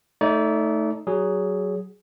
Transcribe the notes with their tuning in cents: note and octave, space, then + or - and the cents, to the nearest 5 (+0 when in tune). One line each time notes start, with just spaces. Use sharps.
A3 +0 D#4 +15 D5 -30
F#3 +20 G#4 +0